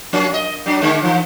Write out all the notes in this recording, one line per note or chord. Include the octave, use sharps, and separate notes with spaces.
F3 A#3 C#4
D#5
F#3 D4
D3 G#3 A#3
E3 F3